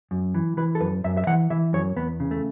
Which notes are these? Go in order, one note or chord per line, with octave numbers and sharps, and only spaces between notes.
F#2
E3
E3 B4
A4
F#2 B4
F#2 E5
E5
E3 F#5
E3 E5
F#2 C#5
E2 B3
C#3
A3